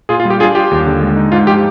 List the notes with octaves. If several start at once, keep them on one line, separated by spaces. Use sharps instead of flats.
A#2 F4 G#4
F4
G3
G4
D4 F4 G#4
F4 G4
D#2
D3
G#3
D#4
G#2 F4
F3 G4